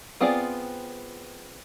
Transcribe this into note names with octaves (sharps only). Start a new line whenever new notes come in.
B3 C4 F4 G#4 D5